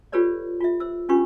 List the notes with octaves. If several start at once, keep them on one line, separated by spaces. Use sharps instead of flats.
F4 G4 A4 B4 C#5 D5
F4 E5
C5 E6
C#4 D4 F4 G4 B4 C#6